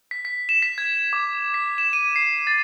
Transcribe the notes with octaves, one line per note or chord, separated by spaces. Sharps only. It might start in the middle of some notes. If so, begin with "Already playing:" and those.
B6
B6
E7
B6
G#6
D6
B6
E7
D#7
C7
A6